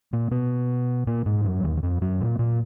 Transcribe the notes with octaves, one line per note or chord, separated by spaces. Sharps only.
A#2 A#3
B2 B3
A#2 A#3
G#2 G#3
F#2 F#3
D#2 D#3
D#3
F2 F3
F#2 F#3
A#2 A#3
A#2 A#3